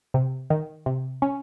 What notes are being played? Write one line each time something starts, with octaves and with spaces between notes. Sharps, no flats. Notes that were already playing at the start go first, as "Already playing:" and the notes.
C3
D#3
C3
C#4